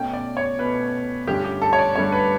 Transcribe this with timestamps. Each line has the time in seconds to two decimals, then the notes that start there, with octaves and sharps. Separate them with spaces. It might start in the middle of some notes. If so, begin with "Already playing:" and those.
Already playing: B2 A3 C#4 G5
0.13 D5
0.37 C#5
0.59 B2 A3 C#4 B4
1.27 G2 D3 A3 C#4 G4
1.44 G4
1.62 A4
1.73 C#5
1.79 D5
1.95 G2 D3 A3 C#4 C#5
2.12 B4